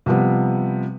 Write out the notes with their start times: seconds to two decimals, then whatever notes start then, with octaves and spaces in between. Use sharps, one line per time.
0.06 C3 F3 G3 B3